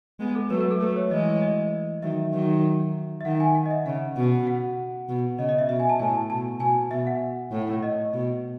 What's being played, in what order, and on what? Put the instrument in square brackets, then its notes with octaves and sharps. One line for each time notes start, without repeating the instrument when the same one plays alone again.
[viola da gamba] G#3 B3
[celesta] A4
[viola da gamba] F#3 A3 [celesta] B4
[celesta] B4
A4
[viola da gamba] F#3 A3 [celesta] B4
[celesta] C#5
[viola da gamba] E3 G#3 [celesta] D#5
[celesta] D#5
[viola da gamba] D#3 F#3 [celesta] E5
[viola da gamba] D#3 F#3
[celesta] E5
[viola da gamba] D#3 [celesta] F#5
[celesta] G#5
F#5
D#5
E5
[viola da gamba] C#3 [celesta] F#5
[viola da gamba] B2
[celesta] F#5
[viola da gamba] B2
[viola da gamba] C#3 [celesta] D#5
[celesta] D#5
E5
[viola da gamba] B2 [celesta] E5
[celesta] G#5
A5
[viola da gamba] A2 [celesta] G#5
[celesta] A5
[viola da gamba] B2 [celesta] A5
[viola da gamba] B2 [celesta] G#5
[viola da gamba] B2 [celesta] E5
[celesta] F#5
[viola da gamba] A2
[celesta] D#5
[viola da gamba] B2